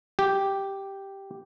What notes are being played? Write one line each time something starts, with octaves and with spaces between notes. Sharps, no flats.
G4